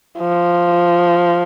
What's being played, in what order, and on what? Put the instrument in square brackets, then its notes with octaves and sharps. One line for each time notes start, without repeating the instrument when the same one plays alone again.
[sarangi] F3